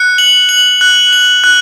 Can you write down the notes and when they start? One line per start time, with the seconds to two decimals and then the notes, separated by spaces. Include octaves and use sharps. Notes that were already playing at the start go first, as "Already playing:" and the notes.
Already playing: F#6 C#7
0.18 F#7
0.49 F#7
0.81 F#6
1.13 F#7
1.44 F#6